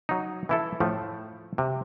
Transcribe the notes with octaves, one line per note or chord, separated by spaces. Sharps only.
F#3 D#4
E3 E4 A4
A2 F3 A3
C3